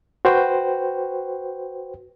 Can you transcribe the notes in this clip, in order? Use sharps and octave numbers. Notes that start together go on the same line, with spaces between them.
F#4 B4 C5 G5